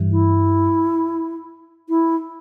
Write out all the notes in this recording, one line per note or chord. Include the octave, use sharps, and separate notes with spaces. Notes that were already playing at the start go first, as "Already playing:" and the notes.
Already playing: G2 E3
E4
E4